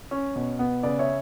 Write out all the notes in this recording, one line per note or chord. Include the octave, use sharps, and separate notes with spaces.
C#4
B2
B3
C#3 B4 D5
C#5 E5